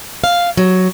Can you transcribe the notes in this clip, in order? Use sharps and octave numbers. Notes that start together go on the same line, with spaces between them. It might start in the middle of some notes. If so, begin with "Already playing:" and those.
F5
F#3